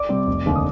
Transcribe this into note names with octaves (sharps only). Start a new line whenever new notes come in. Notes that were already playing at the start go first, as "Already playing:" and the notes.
Already playing: D5 D6
C3 G3 C4
F1
D#2 D3
D#6